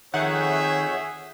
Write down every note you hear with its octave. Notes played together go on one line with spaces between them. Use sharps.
F2 D#3 G#4 C#5 E5 F#5 G6